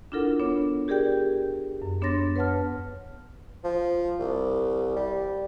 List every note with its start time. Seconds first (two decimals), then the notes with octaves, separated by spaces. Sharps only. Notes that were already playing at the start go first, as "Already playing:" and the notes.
0.12 D4 E4 F4 A4 A#4 F#5
0.40 B3 D4 C#5
0.88 G4 G#4 A#4 D5 G5 G6
1.82 F#2
2.02 B3 D4 C#5 C6 A6 A#6
2.36 B4 C#5 F#5 A5 F6
3.64 F3
4.19 C2
4.96 G3